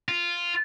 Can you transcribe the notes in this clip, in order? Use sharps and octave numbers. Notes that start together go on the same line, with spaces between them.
F4